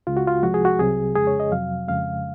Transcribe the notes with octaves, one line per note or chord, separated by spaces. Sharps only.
C#2 C#3 G#3 F4
F#4
F4
C2 C3 F3 G#3 F#4
G#4
F#4
C2 C3 F#3 G#4
F2 C#3 G#3 G#4
C#5
D#5
F2 C3 F#3 F5
F2 C#3 G#3 F5